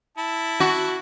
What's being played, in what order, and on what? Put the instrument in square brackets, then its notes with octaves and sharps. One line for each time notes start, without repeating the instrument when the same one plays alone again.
[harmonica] E4 A5
[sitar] F#4